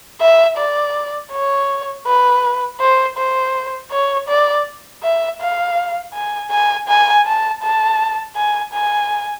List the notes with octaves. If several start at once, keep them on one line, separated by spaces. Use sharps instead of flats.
E5
D5
C#5
B4
C5
C5
C#5
D5
E5
F5
G#5
G#5
G#5
A5
A5
G#5
G#5